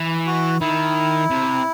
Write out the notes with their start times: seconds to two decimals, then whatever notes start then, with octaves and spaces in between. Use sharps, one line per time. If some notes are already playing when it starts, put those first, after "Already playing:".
Already playing: E3
0.27 F#4
0.61 D#3 E4
1.31 C3